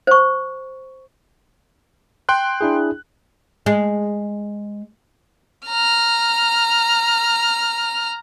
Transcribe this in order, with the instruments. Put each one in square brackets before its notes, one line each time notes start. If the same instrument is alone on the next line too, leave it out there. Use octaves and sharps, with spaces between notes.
[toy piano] C5 C#6
[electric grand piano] G5 C6 F#6
[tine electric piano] D4 E4 G#4
[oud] G#3
[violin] A#5 F6